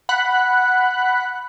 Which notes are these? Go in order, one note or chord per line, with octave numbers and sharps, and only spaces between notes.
F#5 B5 F#6